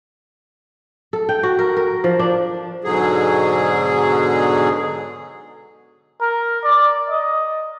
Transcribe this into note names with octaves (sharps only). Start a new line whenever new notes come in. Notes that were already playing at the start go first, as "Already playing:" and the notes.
A4
G5
F#4
A#4
A#4
F3
D4
G#2 B2 D3 F#3 G#4
A#4
D5
D#5